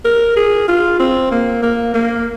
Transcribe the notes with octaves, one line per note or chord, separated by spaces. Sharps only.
A#4
G#4
F4
C4
A#3
A#3
A#3